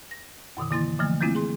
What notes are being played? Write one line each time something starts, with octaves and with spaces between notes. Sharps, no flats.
A#6
F#2 B2 D3 D#3
D3 E3 A#3 E4 C6 A6
D3 E3 F3 A3 A#3
G3 A3 A#3 C4 E4 F4
G#4 C6